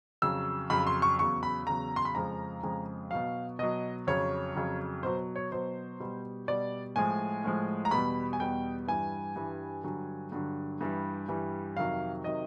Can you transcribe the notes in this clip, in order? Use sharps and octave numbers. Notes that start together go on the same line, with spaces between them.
F2 C#3 F#3 E6
F2 C#3 F#3 B5
C6
C#6
E2 C#3 F#3 C#6
B5
E2 C#3 F#3 A#5
C6
B5
F2 C#3 F3 G#3 A#5
F2 C#3 F3 G#3
B2 F#3 F5
B2 F#3 D#5
F2 C#3 F#3 C#5
F2 C#3 F#3
B2 F#3 C5
C#5
B2 F#3 C5
B2 G3
B2 G3 D5
A2 F3 G#3 G#5
A2 F3 G#3
A#5
E2 B2 G3 B5
G#5
E2 B2 G3 G5
G2 E3 G3 G#5
G2 E3 G3
G2 D3 F#3
G2 D3 F#3
G2 E3 G3
G2 E3 G3
F2 C3 D#3 F#3 F5
C3 D#3 F#3 D#5